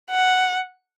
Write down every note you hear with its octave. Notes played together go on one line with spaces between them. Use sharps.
F#5